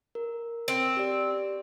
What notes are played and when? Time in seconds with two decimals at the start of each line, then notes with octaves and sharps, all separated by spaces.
0.15 A#4
0.68 C4
0.97 G4 D5